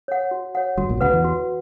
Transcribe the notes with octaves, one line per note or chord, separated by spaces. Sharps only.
C#5 F#5
F#4
C#5 F#5
G1 G2 F#4
A#1 A#2
B2
C#2 C#3 B4 F#5 B5
E2 E3
F#4